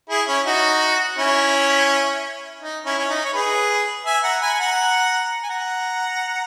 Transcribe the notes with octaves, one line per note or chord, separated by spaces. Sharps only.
E4 G#4
C#4 E4
D#4 F#4
C#4 E4
D#4
C#4 E4
C#4
D#4
C#5
G#4 B4
E5 G#5
F#5 A#5
G#5 B5
G#5
F#5 A#5
G#5
F#5 A#5